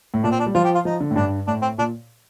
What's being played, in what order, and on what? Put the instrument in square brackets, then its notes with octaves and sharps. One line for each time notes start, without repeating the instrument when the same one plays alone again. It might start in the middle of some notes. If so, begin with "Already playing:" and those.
[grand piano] A2
[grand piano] A#2 [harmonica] D4
[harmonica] C4
D4
[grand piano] G3
[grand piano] F3 [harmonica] F4
[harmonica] G4
F4
[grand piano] F3 [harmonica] D#4
[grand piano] D3
A2
[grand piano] G2 [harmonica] D4
[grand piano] A2 [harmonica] D4
[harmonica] C4
[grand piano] A#2 [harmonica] D4